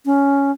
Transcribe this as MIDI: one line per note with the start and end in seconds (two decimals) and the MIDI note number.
0.05 0.51 61